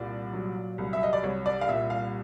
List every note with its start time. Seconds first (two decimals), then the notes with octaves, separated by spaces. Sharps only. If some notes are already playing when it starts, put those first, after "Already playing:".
Already playing: C2 A#2 D5
0.33 F#3
0.78 C2
0.93 E5
1.03 D#5
1.13 D5
1.23 C2 C#5
1.46 D5
1.61 F5
1.69 A#2 E5
1.90 F5